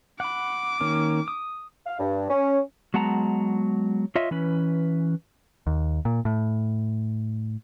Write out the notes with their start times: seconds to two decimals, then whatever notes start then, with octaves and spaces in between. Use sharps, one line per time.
0.20 F#5 B5 D6
0.80 D#3 A#3 C#4
1.28 D#6
1.87 F5
1.99 G2
2.30 C#4
2.94 F#3 G#3 B3 F#5 A5 A#5
4.16 F4 C#5 D#5 E5
4.31 E3 C#4 B4
5.67 D#2
6.05 A#2
6.25 A2